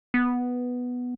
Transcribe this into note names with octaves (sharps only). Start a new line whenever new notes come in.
B3